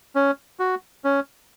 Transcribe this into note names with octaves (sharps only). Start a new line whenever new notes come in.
C#4
F#4
C#4